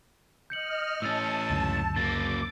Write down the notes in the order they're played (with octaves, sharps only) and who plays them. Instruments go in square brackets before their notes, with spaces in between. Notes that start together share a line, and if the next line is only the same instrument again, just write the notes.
[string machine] D#5 F6 [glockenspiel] G6 C#7 F#7
[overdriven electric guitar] A2 C#4 [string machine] A5 [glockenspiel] E6 A6
[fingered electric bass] C#2 F#2 D3
[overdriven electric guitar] C#3 A#3 [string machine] D6 [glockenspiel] A6